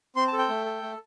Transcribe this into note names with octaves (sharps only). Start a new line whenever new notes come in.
C4 C6
A5
A4
G5
A3
A4
A3